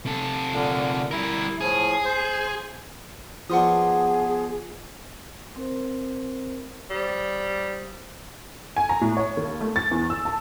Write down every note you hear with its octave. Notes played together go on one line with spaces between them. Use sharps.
C3 A4
A#2 D3
G3 E4 A#4
A2 F3 G#4
C5
F3 B3 D4 F4 G#4 F#5 C6 D#6
C4 A#4 C5
G3 C5 D#6
G#5
A#5
A2
C#5
D#2
A3
A6
E2
E6
A5